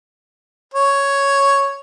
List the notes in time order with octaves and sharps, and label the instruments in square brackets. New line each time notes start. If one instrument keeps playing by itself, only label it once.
[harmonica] C#5